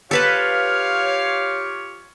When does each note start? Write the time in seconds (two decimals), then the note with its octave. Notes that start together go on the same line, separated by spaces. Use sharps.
0.11 F4 G4 A4 B4 C#5 F5 A5